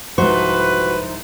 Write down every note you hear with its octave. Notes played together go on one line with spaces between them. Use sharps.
C2 G#2 F3 F#4 B4 C5 C#6